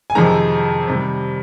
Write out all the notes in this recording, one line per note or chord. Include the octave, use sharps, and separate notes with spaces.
G#5
F2 C3 D#3 G#3 A#5
C3 D#3 G3